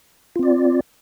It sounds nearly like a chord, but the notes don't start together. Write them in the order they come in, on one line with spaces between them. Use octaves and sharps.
F4 C4 D5